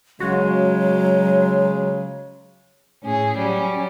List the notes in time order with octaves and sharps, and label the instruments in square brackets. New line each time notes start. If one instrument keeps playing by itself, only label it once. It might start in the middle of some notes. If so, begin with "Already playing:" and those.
[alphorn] C#3 [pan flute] F#3 [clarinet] G#3 [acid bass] F#4
[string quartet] A2 C#4 G#4
F#3 G3 C#4